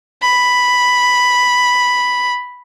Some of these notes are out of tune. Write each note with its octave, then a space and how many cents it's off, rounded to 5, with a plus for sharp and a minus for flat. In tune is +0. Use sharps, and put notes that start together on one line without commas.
B5 +0